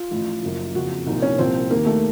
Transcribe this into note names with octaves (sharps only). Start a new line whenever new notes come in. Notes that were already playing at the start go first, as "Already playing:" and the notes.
Already playing: F4
A1 A2 F3
F#1 F#2 F3
F#1 F2 C#3 F3 F#4
C2 A#2 F3 D#4
C#4
C2 A#2 F3 C4
D#2 D#3 A#3
A3